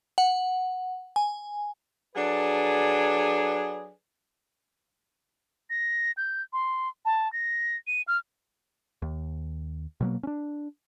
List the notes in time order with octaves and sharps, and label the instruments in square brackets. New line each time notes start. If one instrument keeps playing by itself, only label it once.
[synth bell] F#5
G#5
[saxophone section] F#3 D4 G#4 A4 B4 D5
[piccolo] A#6
G6
C6
A5
A#6
D#7
F6
[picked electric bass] D#2
B2 F#3 A#3
C#4 D4